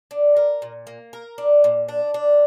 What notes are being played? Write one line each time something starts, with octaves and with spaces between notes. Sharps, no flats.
D4
A#4
A#2
A#3
A#4
D4
A#2
D4
D4